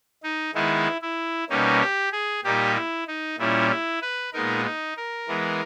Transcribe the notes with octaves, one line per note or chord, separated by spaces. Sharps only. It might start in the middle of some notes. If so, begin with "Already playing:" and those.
D#4
D#3 G#3 B3 D#4 E4
E4
B2 G3 A#3 C#4 D#4
G4
G#4
A#2 G3 A#3 D#4 G4
E4
D#4
A#2 G3 C#4 E4
E4
B4
A#2 G#3 B3 D#4 A#4
D#4
A#4
E3 G#3 B3